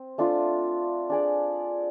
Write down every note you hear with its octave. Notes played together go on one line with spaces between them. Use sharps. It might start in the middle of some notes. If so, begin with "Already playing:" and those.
Already playing: C4
A3 D4 F4
D4 G#4 D5